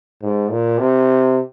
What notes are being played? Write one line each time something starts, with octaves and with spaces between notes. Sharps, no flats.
G#2
A#2
C3